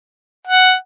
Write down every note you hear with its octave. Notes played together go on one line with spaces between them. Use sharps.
F#5